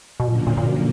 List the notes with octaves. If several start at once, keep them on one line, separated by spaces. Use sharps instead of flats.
B2
F#2 A#2 D3 F3 A#3
A#2
A#2
B2